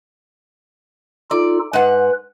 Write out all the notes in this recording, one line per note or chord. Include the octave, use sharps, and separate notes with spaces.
D#4 F4 A4 D5
G#2 B4 F#5